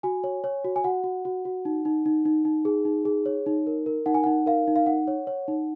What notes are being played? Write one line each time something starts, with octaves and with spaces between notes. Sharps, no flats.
F#4 G#5
C#5
C#5
F#4
G#5
F#4 F#5
F#4
F#4
F#4
D#4
D#4
D#4
D#4
D#4
G#4
D#4
G#4
C#5
D#4
A#4
A#4
D#4 F#5
G#5
D#4 F#5
A#4 F5
D#4
F5
D#4 F#5
C#5
C#5
D#4